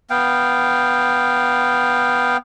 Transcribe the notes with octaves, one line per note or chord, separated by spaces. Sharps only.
B3 F5 G5